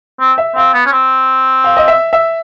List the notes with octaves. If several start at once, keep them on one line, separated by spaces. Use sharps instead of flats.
C4
E5
C4 F5
B3
C#4
C4
F5
D#5
E5
E5